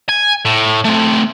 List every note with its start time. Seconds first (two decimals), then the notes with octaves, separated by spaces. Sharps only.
0.09 G#5
0.45 A2
0.85 A3 C4